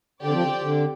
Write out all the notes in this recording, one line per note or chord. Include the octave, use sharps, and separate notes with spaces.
D3 C4 G4 D5 G5
F3
D3
D3